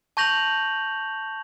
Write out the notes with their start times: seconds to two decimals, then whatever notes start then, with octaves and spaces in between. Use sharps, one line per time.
0.17 A5 C#6 G6 A#6 F7 F#7